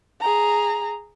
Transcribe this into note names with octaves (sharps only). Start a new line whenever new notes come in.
G#4 A#5